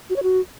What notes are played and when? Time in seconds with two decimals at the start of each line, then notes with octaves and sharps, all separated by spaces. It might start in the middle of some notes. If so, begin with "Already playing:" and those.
0.09 F#4
0.16 C#5
0.23 F#4